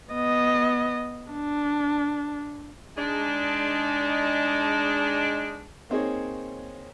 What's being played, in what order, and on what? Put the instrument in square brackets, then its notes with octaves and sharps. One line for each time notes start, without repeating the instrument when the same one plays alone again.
[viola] B3 D#5
D4
[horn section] G#3 D4 D#4
[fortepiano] A#3 C4 D#4 G#4 C#5